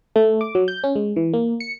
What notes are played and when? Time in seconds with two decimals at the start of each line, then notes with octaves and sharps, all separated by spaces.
0.16 A3
0.41 D6
0.55 F#3
0.68 G6
0.84 C#4
0.95 G#3
1.16 E3
1.33 A#3
1.60 C#7